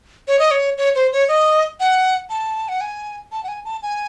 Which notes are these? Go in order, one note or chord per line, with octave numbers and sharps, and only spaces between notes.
C#5
D#5
C#5
C#5
C5
C#5
D#5
F#5
A5
F#5
G#5
A5
F#5
G#5
A5
G#5